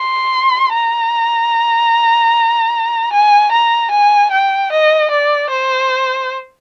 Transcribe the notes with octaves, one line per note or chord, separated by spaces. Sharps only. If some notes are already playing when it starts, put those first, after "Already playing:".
Already playing: C6
A#5
G#5
A#5
G#5
G5
D#5
D5
C5